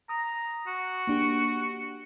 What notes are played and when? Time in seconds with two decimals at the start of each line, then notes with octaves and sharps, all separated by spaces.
0.09 A#5 D#6
0.67 F#4
1.07 A#3 D4 G4